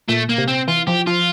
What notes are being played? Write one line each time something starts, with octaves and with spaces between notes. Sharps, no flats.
A#2 A3
A#3
C3
C4
E3 F4
F3 G4
F3 F4